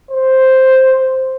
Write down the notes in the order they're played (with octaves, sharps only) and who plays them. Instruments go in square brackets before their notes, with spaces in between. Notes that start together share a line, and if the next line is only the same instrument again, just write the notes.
[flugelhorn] C5